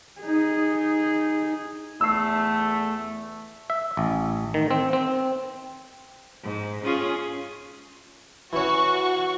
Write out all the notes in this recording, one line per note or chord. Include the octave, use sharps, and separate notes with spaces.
D#4 G#4
E2 A3 E6 C7
E5
A1
D#3
C4
C4
G#2
C#4 F4 G#4
E3 C#4 F#4 C#6